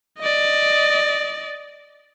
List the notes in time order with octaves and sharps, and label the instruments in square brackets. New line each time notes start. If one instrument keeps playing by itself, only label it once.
[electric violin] D5 D#5